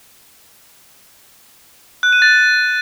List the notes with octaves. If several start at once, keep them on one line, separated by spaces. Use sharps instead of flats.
F#6
D#7
A6